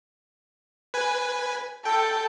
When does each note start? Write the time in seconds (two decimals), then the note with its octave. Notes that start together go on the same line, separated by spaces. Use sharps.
0.94 B4 G#5
1.85 A4 G5